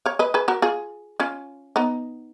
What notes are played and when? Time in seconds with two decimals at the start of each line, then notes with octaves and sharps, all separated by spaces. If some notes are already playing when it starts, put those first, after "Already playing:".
0.06 C#5 F5
0.19 B4 D#5
0.34 G#4 B4
0.48 F#4 A#4
0.62 F4 G#4
1.20 C#4 F4
1.76 B3 D#4